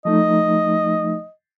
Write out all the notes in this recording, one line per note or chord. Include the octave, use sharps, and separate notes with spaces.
F3 A3 D#4 D#5